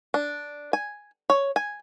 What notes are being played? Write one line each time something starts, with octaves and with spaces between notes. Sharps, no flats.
D4
G#5
C#5
G#5